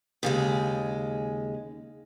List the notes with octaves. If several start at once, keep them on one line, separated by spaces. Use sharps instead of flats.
D#2 C#3 G#3